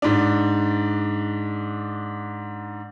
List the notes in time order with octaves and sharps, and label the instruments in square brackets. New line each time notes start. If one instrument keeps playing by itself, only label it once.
[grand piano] G#2 D4